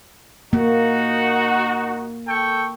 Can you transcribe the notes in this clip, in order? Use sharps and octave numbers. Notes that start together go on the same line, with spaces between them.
A#3 D#4 F#4
A4 G5 C#6